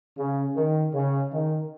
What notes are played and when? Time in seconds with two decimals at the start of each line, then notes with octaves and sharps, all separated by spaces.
0.17 C#3
0.56 D#3
0.94 C#3
1.32 D#3